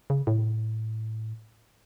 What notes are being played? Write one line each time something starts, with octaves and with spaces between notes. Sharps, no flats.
C#3
A2